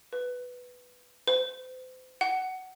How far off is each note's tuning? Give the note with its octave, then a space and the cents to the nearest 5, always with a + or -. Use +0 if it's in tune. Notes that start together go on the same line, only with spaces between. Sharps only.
B4 +0
C5 -40
F#5 +15